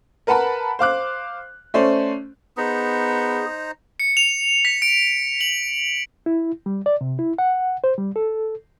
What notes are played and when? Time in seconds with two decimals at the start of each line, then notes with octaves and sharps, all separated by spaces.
0.27 A#4 B4 F#5 A5 B5
0.79 C5 F5 D6 F#6
1.74 A3 C#4 C5 D5
2.57 B3 D#4 G#4 C5 A#5
4.00 C#7
4.17 F7
4.65 B6
4.82 D7
5.41 F#7
6.26 E4
6.66 G3
6.86 D5
7.01 C3
7.19 E4
7.38 F#5
7.84 C5
7.98 G3
8.16 A4